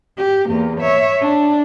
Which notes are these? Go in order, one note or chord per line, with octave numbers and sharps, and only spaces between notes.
G4
E2 A#3
C#5 E5
D4